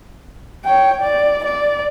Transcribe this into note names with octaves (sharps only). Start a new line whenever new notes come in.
C#5 G5
D5
D5